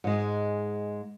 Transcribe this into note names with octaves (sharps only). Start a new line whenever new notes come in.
G#2 G#3